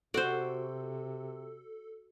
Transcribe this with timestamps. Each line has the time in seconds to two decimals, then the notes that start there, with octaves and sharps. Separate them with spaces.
0.14 C3 F#4 A4 C5 D5